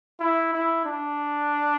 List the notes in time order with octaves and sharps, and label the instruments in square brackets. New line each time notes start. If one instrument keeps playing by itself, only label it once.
[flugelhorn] E4
E4
D4